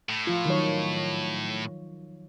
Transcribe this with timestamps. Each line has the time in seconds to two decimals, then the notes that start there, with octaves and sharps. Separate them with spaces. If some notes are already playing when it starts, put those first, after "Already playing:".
0.09 A2
0.27 F3 F4
0.45 D#3 F#3 C#5